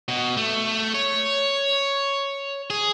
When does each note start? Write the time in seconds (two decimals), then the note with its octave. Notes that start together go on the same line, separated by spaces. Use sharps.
0.08 B2
0.37 A3
0.95 C#5
2.70 G#4